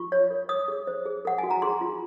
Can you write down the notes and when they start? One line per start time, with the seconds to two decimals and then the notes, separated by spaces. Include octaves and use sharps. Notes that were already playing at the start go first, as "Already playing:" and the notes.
Already playing: F4 C#6
0.12 C#5
0.31 A#4
0.49 C#5 D#6
0.68 G#4
0.87 C5
1.06 G#4
1.25 A#4 F#5
1.38 F#4 G#5
1.51 A#5
1.62 G#4 C6
1.81 F4